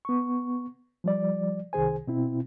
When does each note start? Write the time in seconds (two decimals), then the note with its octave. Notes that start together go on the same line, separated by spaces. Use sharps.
0.05 B3 C#6
1.04 F3 G3 D5
1.73 C2 C3 D#3 G#4 C5 G#5
2.07 B2 C4 E4